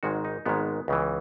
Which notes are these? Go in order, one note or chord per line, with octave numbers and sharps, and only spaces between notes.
G#1 G#2 D#3 G#3 F#4
D#4
G#1 G#2 D#3 G#3 B3
C#2 C#3 E3